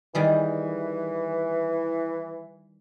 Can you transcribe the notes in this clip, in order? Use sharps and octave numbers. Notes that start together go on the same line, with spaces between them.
D#3 E3 G3 G#4